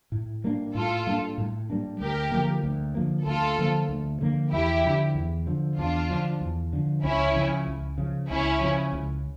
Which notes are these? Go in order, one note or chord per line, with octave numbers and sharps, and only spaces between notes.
A2
G3 A#3 D4
A2 F4 A4
G3 A#3 D4
A2
G3 A#3 D4
D2 G4 A#4
D3 F3 A#3
D2
D3 F3 A#3
D2 F4 A4
D3 F3 A#3
D2
D3 F3 A#3
E2 E4 G4
D3 F3
E2
D3 F3
E2 D4 F4
D3 F3
E2
D3 F3
C#2 C#4 E4
C#3 F3
C#2
C#3 F3
C#2 C#4 E4
C#3 F3
C#2